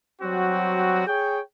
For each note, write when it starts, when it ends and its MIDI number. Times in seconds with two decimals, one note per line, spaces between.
0.22 1.04 54
0.22 1.04 55
0.22 1.04 60
0.22 1.04 66
1.06 1.39 68
1.06 1.39 73
1.06 1.39 79